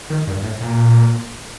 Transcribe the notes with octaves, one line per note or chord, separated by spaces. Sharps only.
D#3
G2
A2
A#2